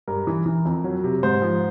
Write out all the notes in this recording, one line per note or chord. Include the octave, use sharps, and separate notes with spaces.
G2 A#4
E3
E3
F2
F#3
C3
G#2 C5
F3